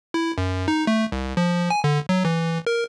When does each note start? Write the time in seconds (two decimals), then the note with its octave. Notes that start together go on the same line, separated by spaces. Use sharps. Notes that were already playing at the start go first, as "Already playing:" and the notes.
0.14 E4
0.38 F#2
0.68 D#4
0.87 A3
1.12 C2
1.37 F3
1.70 G#5
1.84 D3
2.09 F#3
2.25 E3
2.67 A#4